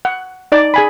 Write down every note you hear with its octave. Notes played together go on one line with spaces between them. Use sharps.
F#5
D#4 D5 D6
G#4 G#5 B5